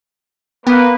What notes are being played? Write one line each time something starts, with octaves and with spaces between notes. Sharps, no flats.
A#3 B3 B4